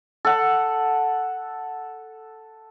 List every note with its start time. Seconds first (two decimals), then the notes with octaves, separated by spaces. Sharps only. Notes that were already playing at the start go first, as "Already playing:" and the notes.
0.25 A4 F#5